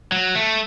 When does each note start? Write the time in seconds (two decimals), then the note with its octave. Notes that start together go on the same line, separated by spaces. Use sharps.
0.12 F#3
0.36 A3